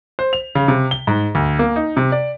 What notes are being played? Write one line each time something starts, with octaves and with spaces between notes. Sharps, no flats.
C5
F7
C#3
C3
G7
G#2
D2
A#3
D#4
C3
D5